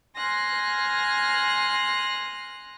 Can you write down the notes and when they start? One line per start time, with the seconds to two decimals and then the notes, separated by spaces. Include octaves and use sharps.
0.17 G#5 C6 F6 F#6 A#6